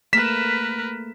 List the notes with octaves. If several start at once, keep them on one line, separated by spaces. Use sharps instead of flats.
A3 A#3 G#4 A#4 B4 B6 E7